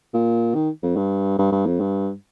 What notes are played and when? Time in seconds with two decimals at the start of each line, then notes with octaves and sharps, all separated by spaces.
0.14 A#2
0.55 D#3
0.83 F2
0.96 G2
1.38 G2
1.52 G2
1.66 F2
1.80 G2